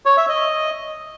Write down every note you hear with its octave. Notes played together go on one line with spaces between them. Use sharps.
C#5
E5
D#5